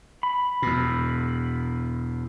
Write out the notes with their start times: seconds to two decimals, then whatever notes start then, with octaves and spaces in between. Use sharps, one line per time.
0.23 B5
0.62 E2 B2